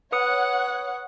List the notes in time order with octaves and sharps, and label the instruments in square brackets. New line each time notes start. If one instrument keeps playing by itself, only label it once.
[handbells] B4 D#6 C#7 [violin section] C#5 F#5